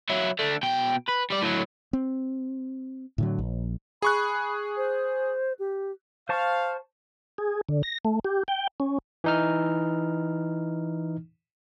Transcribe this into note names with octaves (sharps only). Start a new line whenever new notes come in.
F#3 E4
D3 A3
B2 G5
B4
G3 D5
A2 F#3
C4
A2 D3 F#3
A#1
G#4 B5 C#6 F#6
C5
G4
C5 F5 A5 C#6
G#4
D3
A#6
A3
G4
G5
C#4
E3 D#4 F6